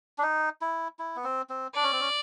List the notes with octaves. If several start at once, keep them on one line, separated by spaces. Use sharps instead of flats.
D4
D#4
E4
E4
B3
C4
C4
D4 D5
C#4
C4
C#4